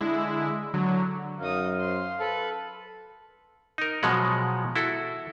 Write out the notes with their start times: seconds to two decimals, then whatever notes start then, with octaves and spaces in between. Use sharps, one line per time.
0.01 D3 G#3 E4
0.74 D3 F#3
1.40 F#2 D#4 F5 D#6
1.80 C5 C6
2.20 A4 B4
3.78 D#4 A#4
4.03 B2 F3 F#3 G#3 F#5
4.76 E4 F#4 A4